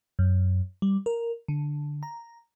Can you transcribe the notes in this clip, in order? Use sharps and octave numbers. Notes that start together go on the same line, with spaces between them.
F#2
G3
A#4
D3
A#5